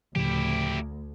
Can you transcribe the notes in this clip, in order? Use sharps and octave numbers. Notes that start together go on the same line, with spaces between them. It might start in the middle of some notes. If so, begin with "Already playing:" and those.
D2 A2 C#3 F3 E4 G4